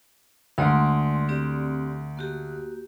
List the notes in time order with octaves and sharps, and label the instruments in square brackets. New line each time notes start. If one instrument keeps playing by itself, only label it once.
[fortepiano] D2 [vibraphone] G#3 D5 C6
[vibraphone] C4 G4 D5
A#3 F#4 G4